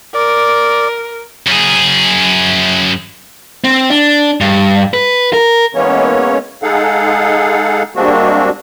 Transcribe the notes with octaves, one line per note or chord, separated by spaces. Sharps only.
A#4 D5
F#2 G#4
C4
D4
G2
B4
A#4
E3 G#3 A#3 B3 C#4 C#5
G#3 D#4 G#4 A4 F5 F#5
G3 G#3 A#3 C4 D4 F#4